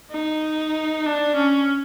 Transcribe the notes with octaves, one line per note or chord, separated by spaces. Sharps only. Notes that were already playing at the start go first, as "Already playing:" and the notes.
D#4
D4
C#4